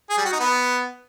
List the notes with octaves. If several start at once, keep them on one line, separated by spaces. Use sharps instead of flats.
G#4
G3
F#4
D#4
B3